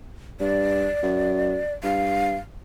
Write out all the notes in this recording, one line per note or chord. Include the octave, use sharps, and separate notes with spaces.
G2 D5
F#2
G2 F5